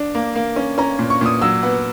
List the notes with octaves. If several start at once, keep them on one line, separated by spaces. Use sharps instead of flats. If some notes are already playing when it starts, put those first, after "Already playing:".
Already playing: D4
A#3
A#3
C#4
C#4 A#5
A#2
C#6
A#2 D#6
F#3 E6
B3